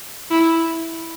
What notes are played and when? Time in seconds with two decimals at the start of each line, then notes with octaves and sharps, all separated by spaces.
0.31 E4